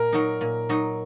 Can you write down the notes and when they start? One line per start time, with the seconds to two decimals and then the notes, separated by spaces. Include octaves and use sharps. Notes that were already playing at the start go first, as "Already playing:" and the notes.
Already playing: A#2 A#4
0.12 F#3 D#4
0.41 A#2
0.69 F#3 D#4